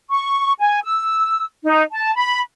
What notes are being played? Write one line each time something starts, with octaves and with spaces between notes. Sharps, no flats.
C#6
G#5
E6
D#4
A5
B5